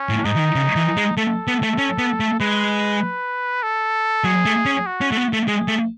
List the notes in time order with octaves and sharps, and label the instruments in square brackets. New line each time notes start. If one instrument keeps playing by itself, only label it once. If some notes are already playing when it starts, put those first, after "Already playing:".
Already playing: [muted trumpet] C#4
[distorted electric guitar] A2
[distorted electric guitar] G#2 [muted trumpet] D#4
[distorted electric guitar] E3
D#3
C#3
E3
G#3
[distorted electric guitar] A3 [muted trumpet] A4
[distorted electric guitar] B3
A3
C#4
B3
A3
[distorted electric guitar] G#3 [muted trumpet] B4
[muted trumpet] A4
[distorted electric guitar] F#3 [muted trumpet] G#4
[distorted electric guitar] A3
C#4
[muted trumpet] F#4
[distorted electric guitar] C#4
A3
B3
A3
[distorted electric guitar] G#3 [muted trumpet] G#4
[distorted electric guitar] A3